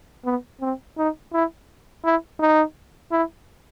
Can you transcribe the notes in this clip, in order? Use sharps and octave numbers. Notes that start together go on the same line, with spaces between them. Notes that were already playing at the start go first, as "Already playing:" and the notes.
B3
C4
D#4
E4
E4
D#4
E4